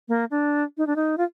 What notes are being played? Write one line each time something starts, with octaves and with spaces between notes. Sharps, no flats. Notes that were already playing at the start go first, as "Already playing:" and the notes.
A#3
D4
D#4
D4
D#4
F4